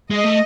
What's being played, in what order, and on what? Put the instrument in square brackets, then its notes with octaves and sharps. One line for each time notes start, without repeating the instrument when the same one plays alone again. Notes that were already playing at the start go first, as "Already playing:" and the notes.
[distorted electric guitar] G#3 [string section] D#5
[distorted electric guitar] A3